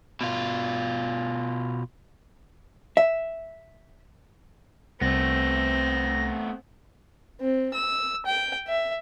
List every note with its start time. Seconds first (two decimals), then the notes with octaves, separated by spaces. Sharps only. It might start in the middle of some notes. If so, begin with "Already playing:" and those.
0.21 B2 F4
2.97 E5
5.01 C2 A3 B3 C4 A#6
7.41 C4
7.74 E6
8.26 G5
8.68 E5